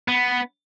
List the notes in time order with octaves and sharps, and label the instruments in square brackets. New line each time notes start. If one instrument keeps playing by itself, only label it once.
[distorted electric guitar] B3